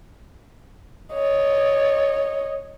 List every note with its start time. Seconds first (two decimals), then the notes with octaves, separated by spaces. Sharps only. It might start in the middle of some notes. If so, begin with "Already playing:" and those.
1.14 C#5 D#5